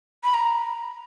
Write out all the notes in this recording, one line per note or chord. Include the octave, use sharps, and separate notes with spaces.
B5
A#5